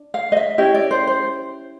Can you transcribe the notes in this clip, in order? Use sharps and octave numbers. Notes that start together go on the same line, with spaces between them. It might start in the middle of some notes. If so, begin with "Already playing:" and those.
Already playing: D4
F5
D#5
E5
C#4 E4 G4 D#5
D5
C5
C5